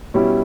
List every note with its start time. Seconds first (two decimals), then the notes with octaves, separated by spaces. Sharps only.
0.14 B2 G3 C#4 E4 G4